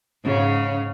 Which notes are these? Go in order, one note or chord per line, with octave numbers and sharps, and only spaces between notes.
G#2 C#3